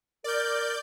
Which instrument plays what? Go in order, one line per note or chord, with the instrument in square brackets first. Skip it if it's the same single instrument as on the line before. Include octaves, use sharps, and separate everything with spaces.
[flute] A#4 [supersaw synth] D5 G6